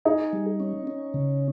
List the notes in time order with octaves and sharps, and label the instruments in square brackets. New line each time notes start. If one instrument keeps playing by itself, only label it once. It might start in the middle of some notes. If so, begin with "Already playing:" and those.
[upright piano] D#4 [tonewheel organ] G#4
[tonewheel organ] G3
C#4
C#4
C#3